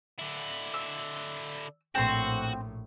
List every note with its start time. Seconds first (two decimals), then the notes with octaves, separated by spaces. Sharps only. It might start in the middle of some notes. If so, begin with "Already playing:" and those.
0.19 D3 E4
0.74 E6
1.95 A#1 A2 C4 F#4 C6